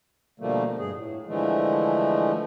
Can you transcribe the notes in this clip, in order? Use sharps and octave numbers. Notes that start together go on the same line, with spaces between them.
B2 D3 F3 G3 A3 A#3
G2 G#4
A2
D3 E3 F3 G#3 A3